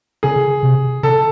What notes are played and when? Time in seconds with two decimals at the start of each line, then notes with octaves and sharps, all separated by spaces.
0.23 C#3 G#4
0.63 C3
1.03 C#3 A4